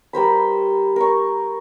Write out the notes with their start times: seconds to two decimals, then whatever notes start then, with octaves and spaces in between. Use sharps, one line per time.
0.13 G3 A#4 C5 B5
0.96 A#4 C#6